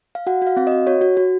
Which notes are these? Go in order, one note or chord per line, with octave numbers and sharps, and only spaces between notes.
F5
F#4 F#5
F#4 F5
C4 F5
D#5
F#4
F#4 C#5
F#4
F#4